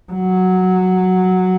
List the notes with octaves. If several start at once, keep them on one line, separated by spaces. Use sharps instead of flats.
F#3